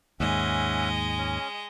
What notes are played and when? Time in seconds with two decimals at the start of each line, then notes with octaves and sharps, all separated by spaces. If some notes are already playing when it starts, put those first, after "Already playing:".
0.20 D#2 G#2 G#3 C#4 D#5 E5 F#5
1.18 C#4